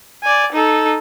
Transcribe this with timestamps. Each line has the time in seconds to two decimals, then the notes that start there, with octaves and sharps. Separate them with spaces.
0.23 D5 G#5
0.52 D#4 A4